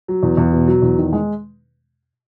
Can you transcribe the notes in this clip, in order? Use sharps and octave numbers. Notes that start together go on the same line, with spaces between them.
F#3
E2
E2
B2
F#3
E2
D#3
G#3